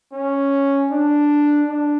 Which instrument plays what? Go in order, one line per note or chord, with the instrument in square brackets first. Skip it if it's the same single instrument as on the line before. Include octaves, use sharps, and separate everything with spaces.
[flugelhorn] C#4
D4
D4